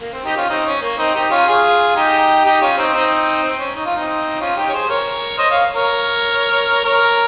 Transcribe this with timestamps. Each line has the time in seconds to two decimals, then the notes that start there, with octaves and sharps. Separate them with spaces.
0.01 A#3
0.13 C4
0.25 D#4 G4
0.37 C#4 F4
0.49 C4 D#4
0.66 C#4
0.82 A#3
0.98 C4 D#4
1.15 D#4 G4
1.31 C#4 F4
1.47 F4 G#4
1.96 D#4 G4
2.45 D#4 G4
2.62 C#4 F4
2.77 C4 D#4
2.94 C4 D#4
3.43 C4
3.59 C#4
3.75 D#4
3.86 F4
3.95 C4 D#4
4.40 C#4 F4
4.57 D#4 G4
4.69 C#5
4.73 G#4 C5
4.89 A#4 C#5
5.38 C5 D#5
5.50 C#5 F5
5.75 A#4 C#5
6.85 A#4 C#5